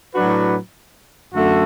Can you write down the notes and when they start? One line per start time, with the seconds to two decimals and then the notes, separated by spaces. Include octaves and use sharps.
0.14 A2 F#3 D4 F#4 B4
1.34 F#2 D3 A3 F#4 A4